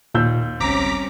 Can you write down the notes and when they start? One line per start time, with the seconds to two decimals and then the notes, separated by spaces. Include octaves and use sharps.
0.14 D#2 A#2 E6 G6
0.60 G#1 C#2 G3 C4 C#4 A#5 D6 B6